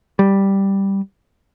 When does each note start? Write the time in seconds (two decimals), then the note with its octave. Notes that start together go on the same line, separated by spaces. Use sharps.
0.19 G3